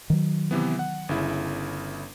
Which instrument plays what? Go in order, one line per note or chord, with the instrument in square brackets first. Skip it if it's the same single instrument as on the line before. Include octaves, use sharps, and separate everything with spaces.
[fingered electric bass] D#3 F#3
[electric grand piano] C3 E3 B3
F#5
G1 C#3 E4